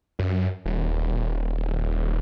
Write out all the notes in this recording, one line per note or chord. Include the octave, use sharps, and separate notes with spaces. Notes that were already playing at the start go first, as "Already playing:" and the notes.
F#2
D#1